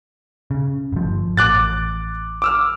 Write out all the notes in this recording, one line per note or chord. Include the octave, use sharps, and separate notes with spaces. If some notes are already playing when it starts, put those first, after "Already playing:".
C#3
G1 F3
A1 D6 F#6 A6
D6 E6 F6